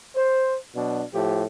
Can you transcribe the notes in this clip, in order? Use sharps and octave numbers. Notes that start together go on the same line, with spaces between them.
C5
B2 F#3 D4
A2 F3 G4